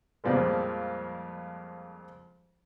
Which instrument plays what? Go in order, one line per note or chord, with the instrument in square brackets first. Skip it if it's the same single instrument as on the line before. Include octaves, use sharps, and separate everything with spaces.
[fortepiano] F2 A#2 F3 G3 G#3